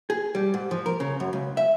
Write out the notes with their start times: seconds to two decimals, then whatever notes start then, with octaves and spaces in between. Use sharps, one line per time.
0.10 G#4
0.35 G3
0.54 G#2
0.71 F3
0.86 A#4
1.00 C#3
1.20 F#2
1.33 C#2
1.57 E5